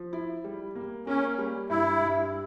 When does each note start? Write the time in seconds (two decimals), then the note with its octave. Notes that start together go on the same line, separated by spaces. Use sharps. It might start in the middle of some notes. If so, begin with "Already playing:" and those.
Already playing: F3
0.13 E4
0.44 G3
0.75 A#3
1.07 A#3 C#4
1.38 G3
1.70 G2 E4
2.01 G2